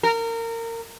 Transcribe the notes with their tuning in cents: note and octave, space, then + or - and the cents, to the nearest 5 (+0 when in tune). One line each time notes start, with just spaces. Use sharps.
A#4 -25